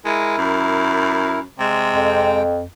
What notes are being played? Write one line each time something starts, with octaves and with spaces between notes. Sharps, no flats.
G#3 E4 A#4
F#2
C3 G#3 G5
F2